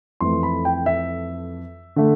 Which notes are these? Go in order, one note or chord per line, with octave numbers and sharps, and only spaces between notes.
F2 E3 A3 C6
B5
G5
E5
D3 A3